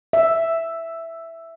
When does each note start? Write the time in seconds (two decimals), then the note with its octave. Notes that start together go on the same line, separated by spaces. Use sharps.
0.13 E5